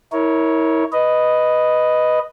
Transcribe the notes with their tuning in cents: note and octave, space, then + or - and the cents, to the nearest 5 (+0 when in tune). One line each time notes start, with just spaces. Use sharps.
E4 -30 A#4 +0 C#5 +0
B4 +0 D#5 +0